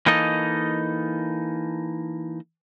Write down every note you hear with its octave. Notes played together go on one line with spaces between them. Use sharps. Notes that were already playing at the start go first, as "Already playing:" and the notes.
E3 A#3 D#4 A4 D#5